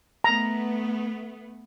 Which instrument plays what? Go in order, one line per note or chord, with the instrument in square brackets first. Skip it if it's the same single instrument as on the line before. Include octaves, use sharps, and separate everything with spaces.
[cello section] A3 B3 [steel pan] A#5